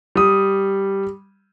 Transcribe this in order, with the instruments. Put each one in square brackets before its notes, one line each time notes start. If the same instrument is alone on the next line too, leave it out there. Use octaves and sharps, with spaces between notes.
[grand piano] G3 D#6